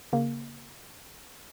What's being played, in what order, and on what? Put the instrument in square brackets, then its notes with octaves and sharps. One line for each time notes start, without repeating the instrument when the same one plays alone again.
[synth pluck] C#3 A#3